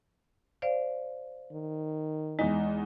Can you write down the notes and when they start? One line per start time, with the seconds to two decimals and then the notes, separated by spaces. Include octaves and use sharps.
0.62 C5 D5 F5
1.52 D#3
2.39 E2 G#3 D#4